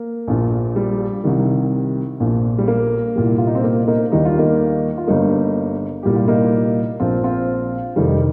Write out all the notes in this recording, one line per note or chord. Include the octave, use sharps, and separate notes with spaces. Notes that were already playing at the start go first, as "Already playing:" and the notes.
Already playing: A#3
A#1 A#2 F3
G3
C2 C3 D#3 G3
A#1 A#2 F3
G3
A#3
C2 A#2 G3
F4
D#4
C4
A#3
A#3 D#4
D#2 D#3 G3 D#4
F4
A#3 D#4
F4
G1 G2 G3 A#3 D#4
C2 A#2 G3 G4
F4
A#3 D#4
A#1 A#2 F3 C4 F4
C4 F4
F1 F2 D#3 G3 C4
D#4